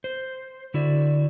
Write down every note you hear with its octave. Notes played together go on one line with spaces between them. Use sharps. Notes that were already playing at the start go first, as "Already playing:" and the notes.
C5
D3 E4 F#4 D5